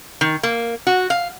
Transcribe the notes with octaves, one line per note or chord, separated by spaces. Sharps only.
D#3
A#3
F#4
F5